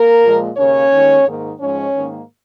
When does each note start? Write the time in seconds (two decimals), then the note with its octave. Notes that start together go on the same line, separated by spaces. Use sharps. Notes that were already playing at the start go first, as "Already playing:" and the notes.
Already playing: A#3 A#4
0.23 A#2 F3 G#3
0.57 D#2 C#3 A#3 C#4 C#5
0.92 D#2 D#3 G#3
1.25 G#2 D#3 A#3
1.60 G#2 F3 G#3 C#4 C#5
1.94 G#2 D#3 A#3